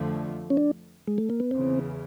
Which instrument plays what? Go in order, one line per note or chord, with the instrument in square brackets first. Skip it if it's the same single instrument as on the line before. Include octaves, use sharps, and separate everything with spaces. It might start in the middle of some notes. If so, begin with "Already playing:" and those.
Already playing: [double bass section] F2 D3 F3 A3
[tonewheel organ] C#4
D4
G#3
A3
A#3
B3
[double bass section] E2 C#3 E3 [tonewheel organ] C4